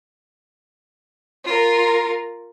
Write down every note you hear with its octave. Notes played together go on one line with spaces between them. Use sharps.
F4 A#4